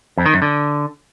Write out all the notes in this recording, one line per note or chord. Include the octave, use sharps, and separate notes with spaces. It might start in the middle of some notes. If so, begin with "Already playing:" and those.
F2
D#3
F#2
D3